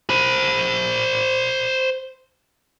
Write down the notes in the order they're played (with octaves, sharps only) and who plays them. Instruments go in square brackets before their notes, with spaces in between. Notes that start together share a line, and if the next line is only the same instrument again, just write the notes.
[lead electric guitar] C5 B5